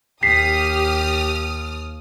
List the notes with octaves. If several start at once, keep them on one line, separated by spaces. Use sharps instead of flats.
D#2 G4 D#6 F6 B6 C7